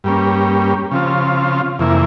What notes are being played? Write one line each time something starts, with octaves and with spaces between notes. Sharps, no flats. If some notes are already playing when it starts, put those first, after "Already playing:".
G2 G3 A#3 C#4
C#3 F3 C4 F4
F2 C3 E3 A#3 E4